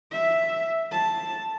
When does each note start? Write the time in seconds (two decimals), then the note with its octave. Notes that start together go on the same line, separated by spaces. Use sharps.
0.12 E5
0.92 A5